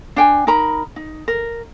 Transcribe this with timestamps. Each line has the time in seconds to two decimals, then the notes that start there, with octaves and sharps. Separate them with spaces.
0.16 D4 G5 G#5
0.47 D#4 A#4 A#5 B5
0.96 D#4
1.28 A#4